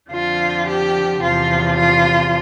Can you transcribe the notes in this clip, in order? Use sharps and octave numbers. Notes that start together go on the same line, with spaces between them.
F2 D3 F3 F4
G4
E2 C3 F3 F4
F4